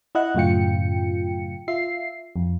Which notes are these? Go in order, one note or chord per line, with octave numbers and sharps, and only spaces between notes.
E4 D#5 F#5 F#6
F#2 A2 C#3 F4 G5 C#7
F4 E5 C7
F2